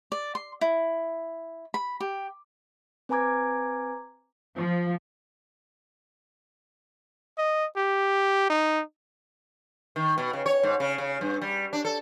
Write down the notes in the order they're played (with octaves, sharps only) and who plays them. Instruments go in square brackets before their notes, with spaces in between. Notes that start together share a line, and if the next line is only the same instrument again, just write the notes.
[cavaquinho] D5
C6
E4
B5
G4
[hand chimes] C4 B4 G#5 A#5 D6 G#6
[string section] F3
[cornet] D#5
G4
D#4
[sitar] D#3
B2
C#3
C#5
G#2
C#3
C#3
G2
G3
D4
A4